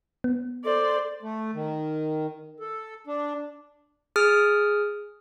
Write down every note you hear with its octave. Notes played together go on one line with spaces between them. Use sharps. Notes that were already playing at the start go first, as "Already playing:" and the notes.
B3
A4 C5 D5
A3
D#3
A4
D4
G#4 D#6 F6